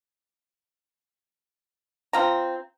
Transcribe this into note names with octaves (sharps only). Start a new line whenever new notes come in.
C4 F4 A#5